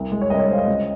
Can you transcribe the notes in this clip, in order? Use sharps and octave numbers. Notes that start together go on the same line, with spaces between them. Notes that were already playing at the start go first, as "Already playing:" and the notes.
Already playing: C2
G#3
C#5
C2 D#5
C#5
G#3 C5 F5
D#5
C#2